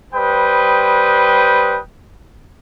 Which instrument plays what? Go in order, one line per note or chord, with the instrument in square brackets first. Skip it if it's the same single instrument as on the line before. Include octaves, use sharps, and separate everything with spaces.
[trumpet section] G3 B4 C5 G5 D#6